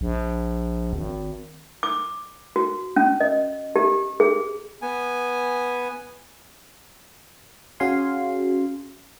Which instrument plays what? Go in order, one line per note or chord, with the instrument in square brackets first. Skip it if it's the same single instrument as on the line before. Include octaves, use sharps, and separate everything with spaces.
[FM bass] A#1
G#1
[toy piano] D6
F#4
C#4
D#5
G4
G#4
[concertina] B3 G#5
[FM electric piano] C#4 F#4 G#4 F5 G#5 C6